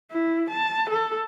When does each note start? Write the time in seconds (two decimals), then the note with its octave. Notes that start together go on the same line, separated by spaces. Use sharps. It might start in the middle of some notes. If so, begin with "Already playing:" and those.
0.11 E4
0.50 A5
0.89 A4